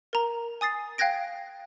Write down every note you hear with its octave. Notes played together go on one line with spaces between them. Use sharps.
A#4 A#5
G#5 D#6 A6 C7
F5 G5 F#6 G#6 A#6 D7